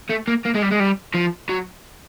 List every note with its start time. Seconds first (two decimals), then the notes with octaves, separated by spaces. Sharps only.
0.10 A3
0.28 A#3
0.45 A#3
0.54 G#3
0.62 G3
0.71 G#3
0.80 G3
1.15 F3
1.49 F#3